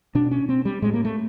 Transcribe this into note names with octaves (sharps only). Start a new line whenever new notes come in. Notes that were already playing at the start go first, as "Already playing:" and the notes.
B2 D4
C#4
C4
G3
A2 G#3
A#3
A3